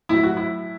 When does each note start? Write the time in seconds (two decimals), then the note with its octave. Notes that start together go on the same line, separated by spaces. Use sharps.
0.09 A2 F#3 E4
0.23 F#4
0.37 E4